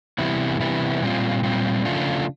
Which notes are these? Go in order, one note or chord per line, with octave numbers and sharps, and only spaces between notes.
C3 E3 G3 B3 E4
C3 E3 G3 B3 E4
A#2 G3 C4 F4
A#2 G3 C4 F4
C#3 F3 A3 D4 F4